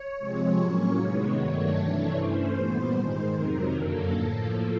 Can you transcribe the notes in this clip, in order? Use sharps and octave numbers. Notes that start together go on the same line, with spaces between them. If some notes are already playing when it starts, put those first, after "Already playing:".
Already playing: C#5
C3 F3 G#3 C4
A2 F#3 A#3 C#4 C#5
C3 D#3 G#3 B3
G2 D#3 F#3 A3 D4
C3 E3 A3 D4
G2 E3 A3 C#4 C5
A#2 G3 B3
G#2 D#3 G#3
F2 C3 D#3 F#3 A#4
F#2 D3 F#3 A#3 A4
A2 F3 A#3